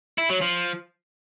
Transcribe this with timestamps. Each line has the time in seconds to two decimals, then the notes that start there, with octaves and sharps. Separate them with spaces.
0.18 E4
0.30 F#3
0.41 F3